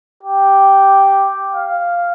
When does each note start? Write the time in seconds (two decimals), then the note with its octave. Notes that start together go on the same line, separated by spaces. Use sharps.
0.23 G4
1.54 F5